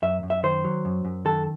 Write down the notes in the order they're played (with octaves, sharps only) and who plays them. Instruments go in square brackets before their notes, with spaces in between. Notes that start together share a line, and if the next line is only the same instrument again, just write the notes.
[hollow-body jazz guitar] F#2 E5
F#2
E5
D#3 C5
F#3
F#2
F#2
D#3 A4